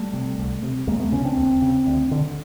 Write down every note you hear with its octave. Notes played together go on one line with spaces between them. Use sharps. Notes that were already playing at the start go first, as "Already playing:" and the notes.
Already playing: G3 A3
C3
C2
C3
D#2 G#3 A#3
A3 B3
C#3 B3 C#4
C4 D4
D#2
C#3
D2
D3